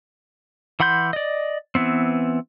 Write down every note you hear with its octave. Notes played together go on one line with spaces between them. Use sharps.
E3 F#5 B5 C6 G6
D5 D#5
E3 B3 C4